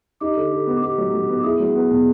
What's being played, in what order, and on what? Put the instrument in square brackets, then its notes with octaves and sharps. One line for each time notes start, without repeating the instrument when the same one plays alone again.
[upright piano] D#4 [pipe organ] G4
[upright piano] D3
D3
B3
[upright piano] B3 [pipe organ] G4
[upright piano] F#3
F#3
B3
[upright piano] E4 [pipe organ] G#4
[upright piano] F#3
B3
B2